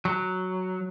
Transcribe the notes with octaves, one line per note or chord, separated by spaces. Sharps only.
F#3